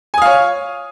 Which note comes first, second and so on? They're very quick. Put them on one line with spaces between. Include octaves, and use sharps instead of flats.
G#5 D#6 F5 C#5